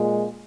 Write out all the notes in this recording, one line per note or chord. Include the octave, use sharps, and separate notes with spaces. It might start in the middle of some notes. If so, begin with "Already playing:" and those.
Already playing: A#2 G#3